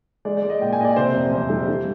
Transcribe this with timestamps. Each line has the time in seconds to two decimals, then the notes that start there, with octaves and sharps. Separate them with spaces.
0.25 G#3 D5
0.37 D5
0.43 G#3
0.50 D#5
0.61 A#2 G5
0.73 G#5
0.79 A#2 D#5
0.85 D5
0.96 C3 C5
1.14 F2
1.32 F2
1.50 G3
1.68 G3